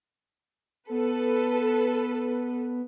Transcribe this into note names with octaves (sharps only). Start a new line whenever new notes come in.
B3 A4 B4